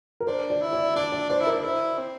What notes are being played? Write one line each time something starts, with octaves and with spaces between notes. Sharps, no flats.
A#4
D4 C5
D5
E4
D5
D4 D5
D5
D4 C5
E4
D4 A#4
E4 C5
C4